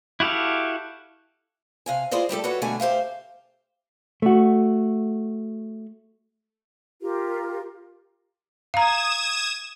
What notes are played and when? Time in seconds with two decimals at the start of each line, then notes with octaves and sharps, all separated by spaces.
0.20 E4 F#4 G4 A4 F5
1.86 C3 F5 G#5
2.11 E4 F4 G#4 C5 D5 D#5
2.29 G3 A3 G4 A4
2.44 F#4 A4 B4 C#5 F#5
2.62 B2 D3 G3 A3 C#5 G#5
2.80 G4 C5 E5 F5
4.22 A3 F#4
7.01 F4 G4 A#4
8.74 F5 A#5 D#6 G#6 E7